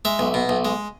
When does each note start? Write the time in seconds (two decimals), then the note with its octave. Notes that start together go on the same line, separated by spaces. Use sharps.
0.05 G#3 E5
0.19 B1
0.34 B2
0.49 B1
0.65 G#3